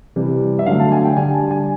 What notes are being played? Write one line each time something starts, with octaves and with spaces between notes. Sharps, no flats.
C3 E3 G3
E5
D3 F#3 A3 F5
A5
G#5
G5
D3 G3 G#5
A5
G#5